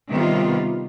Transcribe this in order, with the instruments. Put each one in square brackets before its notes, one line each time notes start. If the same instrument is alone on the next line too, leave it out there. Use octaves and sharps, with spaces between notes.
[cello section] C3 D#3 G3 B3 F4